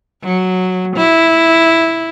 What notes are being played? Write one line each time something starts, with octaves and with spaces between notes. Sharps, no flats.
F#3
E4